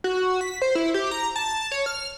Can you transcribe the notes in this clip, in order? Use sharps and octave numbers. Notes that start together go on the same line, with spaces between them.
F#4
B6
C5
E4
G4
A#5
A5
C#5
F6